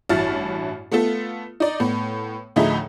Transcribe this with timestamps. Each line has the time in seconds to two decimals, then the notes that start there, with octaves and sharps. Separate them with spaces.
0.09 A1 G2 E4 F#4 F6 A6
0.92 A3 B3 F4 A4
1.60 D#4 D5
1.80 A2 B3
2.56 D2 A2 F3 D#4 G#4 E5